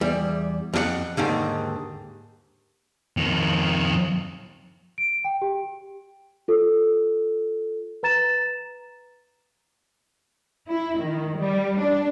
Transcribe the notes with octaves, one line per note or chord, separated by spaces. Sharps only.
E2 G3
F2 G4 F#5
D#2 G#2 D3 D#3
F2 D#3
D7
G5
G4
F4 A4
B4 A#5 A6 E7
E4
D#3
G3
D4